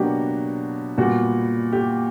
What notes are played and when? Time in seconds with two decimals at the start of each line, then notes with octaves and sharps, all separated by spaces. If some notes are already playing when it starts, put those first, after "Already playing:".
Already playing: B2 F#3 A#3 D4 F#4 G4
0.98 A#2 G3 B3 F#4
1.73 G4